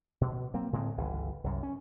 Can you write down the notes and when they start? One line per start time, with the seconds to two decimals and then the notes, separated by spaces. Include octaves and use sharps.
0.21 B2
0.54 F#3 A#3 C4
0.73 A2 D3 G#3 C4
0.97 G1 C#2 E3
1.44 C2 F#2
1.63 C#4